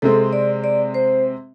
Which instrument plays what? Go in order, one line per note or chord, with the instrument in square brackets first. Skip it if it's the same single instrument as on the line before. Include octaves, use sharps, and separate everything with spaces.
[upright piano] C3 G#3 C4 [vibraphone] A4
[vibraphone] D5
D5
C5